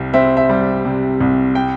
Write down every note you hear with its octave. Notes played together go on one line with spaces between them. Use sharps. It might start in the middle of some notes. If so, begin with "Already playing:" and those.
Already playing: C2 C3 G3
C4 E5
E5
G3
C3
C2
G5